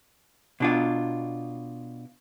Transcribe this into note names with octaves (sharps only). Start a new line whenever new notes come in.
B2 D4 F4